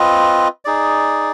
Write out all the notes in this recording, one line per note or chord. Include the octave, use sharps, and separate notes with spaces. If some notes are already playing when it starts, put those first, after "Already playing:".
Already playing: C4 F4 B4 D#5
D#4 G#4 D5